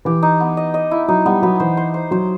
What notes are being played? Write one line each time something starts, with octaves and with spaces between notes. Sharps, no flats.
E3 G4
D#4
B3
D#5
D#5
E4
F#3 D#4
G3 B3
F#3 B3
E3 C5
C5
C5
F#3 C5